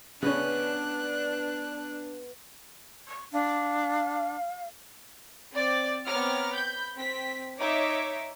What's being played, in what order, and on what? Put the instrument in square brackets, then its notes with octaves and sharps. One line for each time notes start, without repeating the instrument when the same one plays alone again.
[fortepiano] C#3 C#4 [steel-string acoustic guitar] B3 B4 [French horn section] D4 [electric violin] F#6
[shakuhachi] C#6
[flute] D4 [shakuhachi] F5
[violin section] C4 D5 A6
B3 C4 C#5 A#5 D6 F6
B5 G6
C4 B6
D#4 C#5 E5 D6